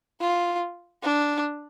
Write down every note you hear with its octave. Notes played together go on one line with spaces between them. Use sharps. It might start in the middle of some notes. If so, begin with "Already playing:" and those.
F4
D4